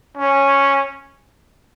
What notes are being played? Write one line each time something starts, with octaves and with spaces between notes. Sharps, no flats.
C#4